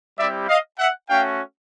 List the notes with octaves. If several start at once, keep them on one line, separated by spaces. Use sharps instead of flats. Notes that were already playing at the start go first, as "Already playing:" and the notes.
G3 C4 E4 G4 D5 E5
D#5 F5
E5 F#5
A3 C#4 F#4 F5 G5